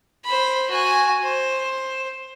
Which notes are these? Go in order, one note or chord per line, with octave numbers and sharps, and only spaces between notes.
C5 B5
F#4 G#5
C5